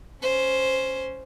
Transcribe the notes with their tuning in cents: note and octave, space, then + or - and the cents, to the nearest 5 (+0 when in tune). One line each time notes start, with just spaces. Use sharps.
C#4 +5 C5 +0